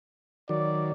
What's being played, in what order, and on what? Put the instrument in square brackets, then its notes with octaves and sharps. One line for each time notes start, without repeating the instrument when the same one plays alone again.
[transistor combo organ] D#3 F#3 [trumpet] D5